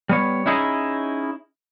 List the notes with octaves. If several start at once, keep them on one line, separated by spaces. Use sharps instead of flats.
G3 B3 C#5
C#4 D#4 E4 G#4 D#5